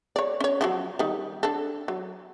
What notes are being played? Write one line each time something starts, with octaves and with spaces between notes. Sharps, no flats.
C#5 D5
C#4 C#5
D3 F3 F#3
D#3 G3
D4 A4
F#3